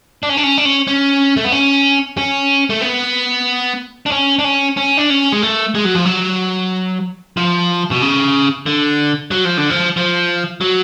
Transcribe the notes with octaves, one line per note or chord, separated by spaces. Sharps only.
D4
C#4
D4
C#4
D4
C#4
C#4
A3
B3
C#4
C#4
A3
B3
D4
C#4
D4
C#4
C#4
D4
C#4
G#3
A3
G#3
F#3
F3
F#3
F3
B2
C#3
D3
F#3
F3
D3
F3
F3
F#3